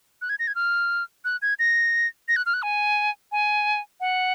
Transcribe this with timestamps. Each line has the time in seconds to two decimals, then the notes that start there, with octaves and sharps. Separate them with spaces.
0.21 F#6
0.29 G#6
0.39 A#6
0.47 G#6
0.55 F6
1.25 F#6
1.42 G#6
1.59 A#6
2.28 A#6
2.36 F#6
2.46 F6
2.54 F#6
2.62 G#5
3.32 G#5
4.00 F#5